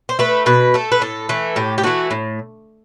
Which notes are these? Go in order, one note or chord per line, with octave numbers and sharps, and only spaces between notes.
C5
A3 B4
B2 B4
A3 A4
B4
A2 A4
E3 A3
A2 G4
G4
E3 A3 F#4
A2